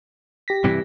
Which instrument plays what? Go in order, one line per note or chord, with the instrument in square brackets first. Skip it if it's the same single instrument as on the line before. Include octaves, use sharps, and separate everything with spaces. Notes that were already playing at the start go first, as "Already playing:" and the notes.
[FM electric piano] G4 A#6 B6
[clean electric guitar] G2 C3 E3